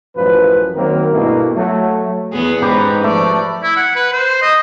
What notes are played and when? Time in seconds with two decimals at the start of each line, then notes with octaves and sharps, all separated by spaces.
0.16 A1 F#2 F3 B4
0.76 D#3 F#3 A#3 C4 A#4
1.11 G2 B2 A3 A#3 E4
1.54 F#3 A3
2.32 E2 B3 G#4
2.62 G#2 C#4 D#4 G4 B4
3.04 F3 A3 D5
3.63 E4
3.77 F#5
3.96 B4
4.12 C5
4.42 D#5